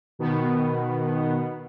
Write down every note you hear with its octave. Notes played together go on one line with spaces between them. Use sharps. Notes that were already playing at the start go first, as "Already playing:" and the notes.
B2 D#3 B3